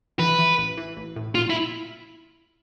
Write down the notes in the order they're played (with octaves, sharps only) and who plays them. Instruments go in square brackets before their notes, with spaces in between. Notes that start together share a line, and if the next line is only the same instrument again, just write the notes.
[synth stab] E3 [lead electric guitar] B4
[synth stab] E3
A1
E3
A1
A2
[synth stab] A#2 [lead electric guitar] F4
[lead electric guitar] E4